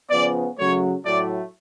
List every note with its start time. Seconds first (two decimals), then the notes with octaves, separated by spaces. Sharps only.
0.10 C#3 F3 B3 D5
0.57 C#3 F#3 A3 C#5
1.04 A2 F#3 A3 D5